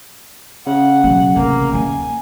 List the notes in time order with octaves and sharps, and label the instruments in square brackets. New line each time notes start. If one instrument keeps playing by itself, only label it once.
[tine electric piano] C#3 [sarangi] F#5
[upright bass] B2 F#3
[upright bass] A1 C3 [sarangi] A#3
[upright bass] D#2 A#3 [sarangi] G#5